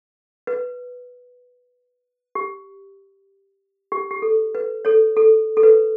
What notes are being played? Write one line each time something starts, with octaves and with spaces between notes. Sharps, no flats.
B4
G4
G4
G4
A4
B4
A4 C#5
A4
A4
B4